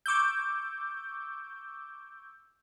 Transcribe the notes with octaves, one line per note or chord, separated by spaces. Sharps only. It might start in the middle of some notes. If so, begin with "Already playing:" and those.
C#6 D6 E6 G6